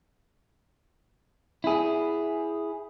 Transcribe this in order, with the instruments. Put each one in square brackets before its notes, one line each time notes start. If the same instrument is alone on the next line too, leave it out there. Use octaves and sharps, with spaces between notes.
[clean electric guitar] E4 G#4